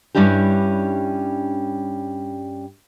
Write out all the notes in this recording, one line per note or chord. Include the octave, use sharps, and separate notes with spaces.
G2 G3 C#4 D4 E4 G4